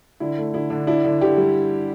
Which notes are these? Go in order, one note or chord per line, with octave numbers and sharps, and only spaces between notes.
D3 E4
A3
D3 E4
D3 D4
D4 E4
D3
D3 G4
G3